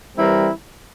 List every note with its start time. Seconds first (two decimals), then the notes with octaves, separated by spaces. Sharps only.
0.17 E3 G3 C4 E4 A#4